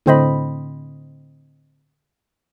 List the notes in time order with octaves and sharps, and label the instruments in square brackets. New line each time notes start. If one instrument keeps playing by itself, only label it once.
[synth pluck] A2 D3 C4 C5 D#5 B5